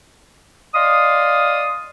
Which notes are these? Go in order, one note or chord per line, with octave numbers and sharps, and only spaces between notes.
D5 D#5 F5 C6 D#6